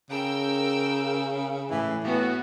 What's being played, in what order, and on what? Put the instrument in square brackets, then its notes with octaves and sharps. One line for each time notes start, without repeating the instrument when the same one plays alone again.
[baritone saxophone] C#3 [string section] A#4 G5 E6
[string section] A2 [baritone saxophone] E3
[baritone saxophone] A2 [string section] B3 F#4